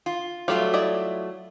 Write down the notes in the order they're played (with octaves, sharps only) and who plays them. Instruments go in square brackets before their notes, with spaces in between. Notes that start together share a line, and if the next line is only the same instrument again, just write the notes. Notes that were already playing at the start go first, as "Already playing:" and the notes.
[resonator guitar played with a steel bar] F4
[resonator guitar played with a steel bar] F#3 A3 F4 [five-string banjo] G3 D5 F5
[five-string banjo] E4 D5 D#5